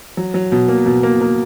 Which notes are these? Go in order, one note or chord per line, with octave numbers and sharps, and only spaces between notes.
F#3
F#3
B2
A#3
B2
A#3
A#3